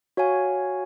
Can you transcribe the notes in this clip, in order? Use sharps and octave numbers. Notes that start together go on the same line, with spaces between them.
F#4 C#5 F5 G#5